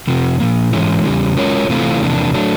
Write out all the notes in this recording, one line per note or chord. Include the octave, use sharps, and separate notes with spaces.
F2 C3 F3
A#2 F3 A#3
G#2 E3 G#3 C#4 E4
E2 C#3 G3
G#3 C#4 F4 A#4 C#5
C3 E3 A3 C4 F4
E2 C3 F3 A#3 D4
F#3 A3 D4